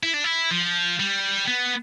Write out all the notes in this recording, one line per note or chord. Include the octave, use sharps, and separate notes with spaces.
E4
D4
E4
F3
G3
B3